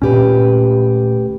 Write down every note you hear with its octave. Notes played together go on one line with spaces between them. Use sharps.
D2 A#2 C#4 G4 B4